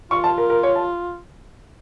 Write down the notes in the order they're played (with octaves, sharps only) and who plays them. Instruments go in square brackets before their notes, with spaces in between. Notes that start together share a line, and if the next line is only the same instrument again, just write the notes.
[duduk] F4 [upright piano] C#6
[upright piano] A5
A#4
A#4
C#5
A5